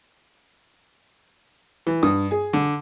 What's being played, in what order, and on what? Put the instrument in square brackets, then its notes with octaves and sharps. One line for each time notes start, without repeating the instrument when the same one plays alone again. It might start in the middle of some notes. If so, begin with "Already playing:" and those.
[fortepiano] E3
[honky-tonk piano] G2 [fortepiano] D#6
[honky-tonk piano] G#4
[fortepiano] D3